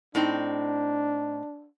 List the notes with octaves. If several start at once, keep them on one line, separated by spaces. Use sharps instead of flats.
A2 C4 D4 D#4